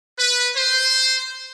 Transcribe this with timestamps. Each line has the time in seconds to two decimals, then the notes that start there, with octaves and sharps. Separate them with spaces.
0.19 B4
0.56 C5